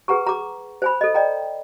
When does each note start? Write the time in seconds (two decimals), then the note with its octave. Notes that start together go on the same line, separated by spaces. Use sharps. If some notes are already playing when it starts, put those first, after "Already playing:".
0.08 G#4 B4 F#5 A#5 C#6
0.26 A#5 D6
0.82 C5 G#5 B5
1.01 A4 D#5
1.14 D5 D#5 G5 A#5